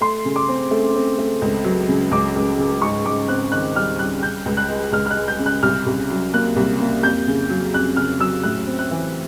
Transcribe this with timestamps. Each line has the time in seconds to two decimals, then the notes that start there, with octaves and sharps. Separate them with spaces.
0.01 A3 C6
0.25 C#3
0.36 D6
0.48 C4
0.71 A3
0.95 C4
1.19 A3
1.42 C#2
1.64 F#3
1.88 C#3
2.11 C#2 D6
2.36 C#2
2.59 C#3
2.82 G#2 C#6
3.05 G#2 D6
3.28 C4 F#6
3.52 D#3 F#6
3.76 G3 F6
3.99 G3 F#6
4.23 C#3 G6
4.45 C#2
4.57 F#6
4.69 G#3
4.92 C#2 F6
5.06 F6
5.10 F#6
5.16 G#3
5.28 G6
5.39 C#3
5.46 F#6
5.63 C2 F6
5.86 C2
6.10 F#3
6.34 A#3 F#6
6.56 C2
6.81 A#3
7.03 F2 G6
7.27 C#3
7.50 F#3
7.74 F2 F#6
7.97 C#3 F6
8.20 F#3 E6
8.43 A2 F#6
8.67 C4
8.79 F#6
8.91 E3